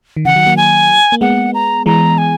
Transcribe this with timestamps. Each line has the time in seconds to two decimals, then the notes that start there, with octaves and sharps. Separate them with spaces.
0.17 D#3
0.25 C#3 E3 F#5
0.36 D#3 F#3
0.46 F#3 A#3
0.57 G#5
1.12 A#3
1.21 G#3 B3 F#5
1.54 A#5
1.86 E3 G#3 A#5
2.18 G#5